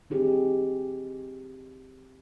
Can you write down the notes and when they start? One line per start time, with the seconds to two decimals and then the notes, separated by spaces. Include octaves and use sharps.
0.10 C4 D#4 G4 G#4